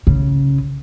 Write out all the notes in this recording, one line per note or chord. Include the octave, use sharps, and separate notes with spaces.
C#3